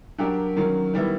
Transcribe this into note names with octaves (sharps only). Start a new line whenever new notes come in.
F#3 A#3 D4 G4 A#4
D#3 F#3 A#3 C#4
D#3 G3 B3 E4